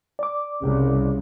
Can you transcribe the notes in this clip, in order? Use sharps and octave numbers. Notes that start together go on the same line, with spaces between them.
D5 D6
C2 C#3